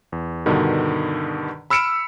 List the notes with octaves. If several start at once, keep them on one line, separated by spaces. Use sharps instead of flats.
E2
G2 B2 D3 D#3
B5 E6 F6 C#7 D7 E7